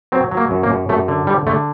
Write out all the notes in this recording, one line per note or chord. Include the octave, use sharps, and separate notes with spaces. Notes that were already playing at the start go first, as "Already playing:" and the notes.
F#3 C4
F#3
A#3
F#2
A#3
F#2
F#2 A3
D3
G3
D3 A3